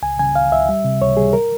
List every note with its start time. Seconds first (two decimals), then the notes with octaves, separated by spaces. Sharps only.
0.02 C#2 G#5
0.19 C#3 G#5
0.35 C#2 F5
0.52 C#2 E5
0.69 G3
0.84 C3
1.00 C#2 C#5
1.17 G3 G#4
1.33 A#4